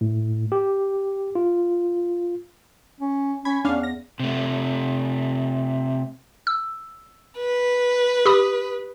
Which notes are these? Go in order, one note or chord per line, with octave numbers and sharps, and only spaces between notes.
A2
G4
F4
C#4
C#4 B5 G#6
E2 C#4 D4 F5
A#6
C3 A3
E6
B4
G4 B5 D#6